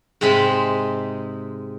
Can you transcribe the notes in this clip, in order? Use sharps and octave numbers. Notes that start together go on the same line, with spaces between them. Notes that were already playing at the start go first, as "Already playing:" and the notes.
G#2 C3 G#3 C4 A5 B5